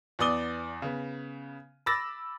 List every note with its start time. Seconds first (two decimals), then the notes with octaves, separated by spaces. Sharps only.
0.19 E2 B3 D5 D#6 G7
0.82 C#3 B3
1.86 B5 D6 E6 A6 A#6